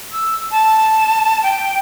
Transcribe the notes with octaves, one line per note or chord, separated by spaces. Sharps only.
E6
A5
G5